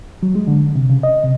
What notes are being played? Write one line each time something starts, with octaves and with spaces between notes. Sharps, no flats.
F#3
G#3
D3
C3
C#3
D#5
C3